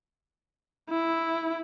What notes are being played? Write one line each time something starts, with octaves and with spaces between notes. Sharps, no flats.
E4